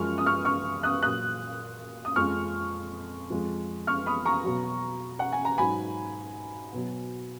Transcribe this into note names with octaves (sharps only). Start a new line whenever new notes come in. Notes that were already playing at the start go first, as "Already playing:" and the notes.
Already playing: F#2 F3 G#3 C#6 F6
D#6
C#6 F6
C#6 F6
D#6 F#6
A#2 F#3 D#6 F#6
D#6
F2 F3 G#3 C#6 F6
F2 F3 G#3
C#6 F6
B5 D#6
A#5 C#6
B2 F#3
F#5
G#5
A#5
G#2 F#3 G#5 B5
B2 F#3